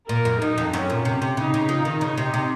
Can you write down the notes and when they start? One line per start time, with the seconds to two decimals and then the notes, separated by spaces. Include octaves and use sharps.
0.09 A#2 A#4
0.25 F#2
0.41 F#2 D#4
0.58 F2
0.73 F#2 C#4
0.90 A#2
1.05 C3
1.22 C3
1.37 C#3 D#4
1.54 C#3
1.69 F3
1.85 D#3
2.01 C#3 D#4
2.18 C3
2.34 C3